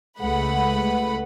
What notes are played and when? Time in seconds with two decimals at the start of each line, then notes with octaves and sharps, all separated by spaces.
0.20 C#2 G#3 A3 B4 F#5 B5